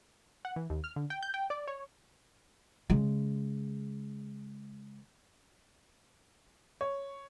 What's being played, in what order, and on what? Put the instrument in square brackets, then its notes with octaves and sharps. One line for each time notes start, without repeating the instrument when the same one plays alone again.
[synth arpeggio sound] F#5
E3
D#2
F6
D3
G5
G6
G5
D5
C#5
[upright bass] C#3 G#3
[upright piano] C#5